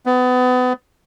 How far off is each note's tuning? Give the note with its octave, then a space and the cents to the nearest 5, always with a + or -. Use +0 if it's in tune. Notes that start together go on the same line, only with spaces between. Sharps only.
B3 +30